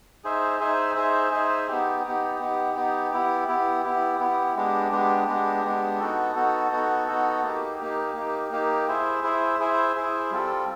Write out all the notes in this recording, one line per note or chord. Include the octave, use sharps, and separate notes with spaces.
D#4 G#4 C5 E5
D#4 G#4 C5 E5
D#4 G#4 C5 E5
D#4 G#4 C5 E5
B3 D#4 G4
B3 D#4 G4
B3 D#4 G4
B3 D#4 G4
B3 E4 G4
B3 E4 G4
B3 E4 G4
B3 E4 G4
G#3 B3 D4 G4
G#3 B3 D4 G4
G#3 B3 D4 G4
G#3 B3 D4 G4
B3 D#4 F#4 A4
B3 D#4 F#4 A4
B3 D#4 F#4 A4
B3 D#4 F#4 A4
A#3 D#4 G4
A#3 D#4 G4
A#3 D#4 G4
A#3 D#4 G4
E4 G#4 C5 E5
E4 G#4 C5 E5
E4 G#4 C5 E5
E4 G#4 C5 E5
G3 C4 F4 A4